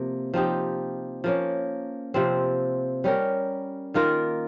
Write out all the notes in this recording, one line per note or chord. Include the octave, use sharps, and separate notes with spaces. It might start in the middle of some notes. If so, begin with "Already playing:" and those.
Already playing: C3 F3 A#3
F3 C4 D#4 G4
F3 A#3 C#4
C3 F3 C4
G3 C#4 G4 A#4
D#3 A#3 F4 A#4